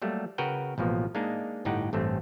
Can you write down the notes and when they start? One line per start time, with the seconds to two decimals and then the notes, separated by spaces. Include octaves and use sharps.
0.02 F#3 G3 A3 A#3
0.38 C#3 F#4 A#4 B4 G5
0.78 A1 B2 F3 A#3
1.15 G#3 A#3 D4 D#4
1.65 G1 A2 D#4 G4 F#5 G5
1.93 A1 G2 A3 C4